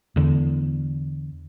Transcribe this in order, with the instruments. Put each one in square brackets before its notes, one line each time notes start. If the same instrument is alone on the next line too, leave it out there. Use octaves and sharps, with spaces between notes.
[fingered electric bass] E2 D3